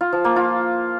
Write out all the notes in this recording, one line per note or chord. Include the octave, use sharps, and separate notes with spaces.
F4
F3
A#3
F4